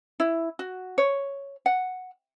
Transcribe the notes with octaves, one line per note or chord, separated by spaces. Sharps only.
E4
F#4
C#5
F#5